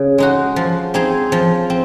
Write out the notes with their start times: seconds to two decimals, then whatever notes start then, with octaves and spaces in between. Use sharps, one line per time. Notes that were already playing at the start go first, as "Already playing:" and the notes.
Already playing: C#3
0.18 G#3 D#4 F#4
0.56 F3
0.94 C4 D#4 G#4
1.32 F3
1.70 C4